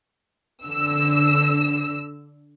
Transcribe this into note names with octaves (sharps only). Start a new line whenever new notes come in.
D3 E6